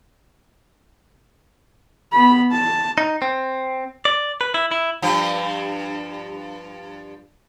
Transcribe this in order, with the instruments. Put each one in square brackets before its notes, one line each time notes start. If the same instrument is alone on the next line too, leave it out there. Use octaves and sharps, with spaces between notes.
[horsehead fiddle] B3 B5
A5
[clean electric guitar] D#4
C4
D5
B4
E4
E4
[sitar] G2 F3